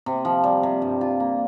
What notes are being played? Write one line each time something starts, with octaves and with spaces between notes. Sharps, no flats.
C3
F3
G3
C3
G2
F4
A#3